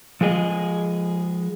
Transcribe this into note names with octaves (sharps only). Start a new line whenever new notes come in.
F3 G#3 G#4 D#5